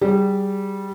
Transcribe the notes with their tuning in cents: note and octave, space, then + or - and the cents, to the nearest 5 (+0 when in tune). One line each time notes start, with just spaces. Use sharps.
G3 -15 G#4 -30